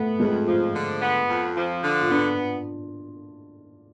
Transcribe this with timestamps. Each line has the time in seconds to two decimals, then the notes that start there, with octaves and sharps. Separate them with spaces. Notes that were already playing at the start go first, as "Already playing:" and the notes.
Already playing: A3 B3
0.19 F2 G#3
0.47 F3 F4
0.74 D3
1.01 B3
1.29 F2
1.57 F3
1.83 D3
2.01 F4
2.11 B3 D4